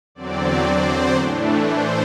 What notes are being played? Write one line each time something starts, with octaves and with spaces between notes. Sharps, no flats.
E2 D3 F#3 C4 D5
C5
A2 E3 A3 D4
C5